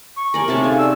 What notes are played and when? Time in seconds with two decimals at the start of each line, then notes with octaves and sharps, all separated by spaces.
0.16 C#6
0.34 A3 G4 A#4 D5 G#5
0.48 C3 C#4 D#4 G4 G#4 A5
0.64 A4 F5 G#5
0.78 D5 E6